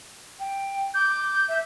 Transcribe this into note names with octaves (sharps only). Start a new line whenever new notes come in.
G5
D6 G6
E5